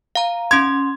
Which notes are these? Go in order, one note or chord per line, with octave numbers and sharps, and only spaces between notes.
F5 A#5
C#4 C6 G#6